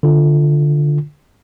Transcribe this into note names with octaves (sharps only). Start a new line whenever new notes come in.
D3 F4